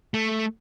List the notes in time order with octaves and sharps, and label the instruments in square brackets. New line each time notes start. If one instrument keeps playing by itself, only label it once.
[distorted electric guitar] A3